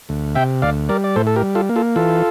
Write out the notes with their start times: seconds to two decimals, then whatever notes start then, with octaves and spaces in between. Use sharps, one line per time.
0.09 D2
0.35 C3 E5 G5
0.62 D2 D5 F5
0.89 G3 A#4 D5
1.04 D5
1.16 A2 A4 C5
1.27 A4
1.36 G4 A#4
1.42 G3
1.55 F4 A4
1.69 A#3
1.76 F4 A4
1.96 E3 F4 A4